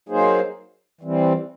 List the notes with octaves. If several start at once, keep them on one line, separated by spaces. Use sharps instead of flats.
F#3 A#3 D#4 G#4 C5
E3 G3 C4